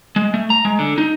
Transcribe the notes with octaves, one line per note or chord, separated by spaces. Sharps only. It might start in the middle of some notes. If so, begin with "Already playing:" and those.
G#3
A3
A#5
G#3
D3
D#4